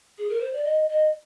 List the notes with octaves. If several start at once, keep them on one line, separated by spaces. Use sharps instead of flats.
G#4
A#4
C5
D5
D#5
D#5